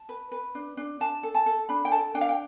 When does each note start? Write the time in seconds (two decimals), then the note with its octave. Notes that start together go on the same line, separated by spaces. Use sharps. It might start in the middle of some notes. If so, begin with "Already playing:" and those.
Already playing: A5
0.09 B4
0.32 B4
0.55 D4
0.77 D4
1.00 D4 A5
1.23 A4
1.34 A5
1.46 A4
1.69 D4 B5
1.85 G5
1.91 A4 A5
2.15 D4 G5
2.21 F5
2.29 G5